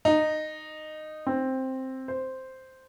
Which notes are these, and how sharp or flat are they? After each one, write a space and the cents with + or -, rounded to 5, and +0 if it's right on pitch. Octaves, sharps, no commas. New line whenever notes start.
D#4 -10
C4 +5
C5 -5